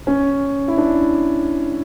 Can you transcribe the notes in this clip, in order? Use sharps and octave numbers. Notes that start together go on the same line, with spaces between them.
C#4
E4
D4